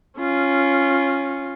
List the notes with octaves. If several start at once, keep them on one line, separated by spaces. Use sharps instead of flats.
C#4 F4